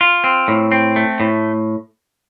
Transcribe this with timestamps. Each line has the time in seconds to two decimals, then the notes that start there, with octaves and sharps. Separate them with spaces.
0.01 F4
0.24 C4
0.48 A2
0.72 C4
0.96 A3
1.20 A2